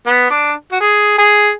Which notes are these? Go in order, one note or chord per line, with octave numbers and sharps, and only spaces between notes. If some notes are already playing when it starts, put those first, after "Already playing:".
B3
D4
F#4
G#4
G#4